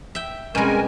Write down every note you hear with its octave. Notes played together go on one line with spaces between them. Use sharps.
E5 G5
B2 G3 G#3 C4 C#4 A#4 G#5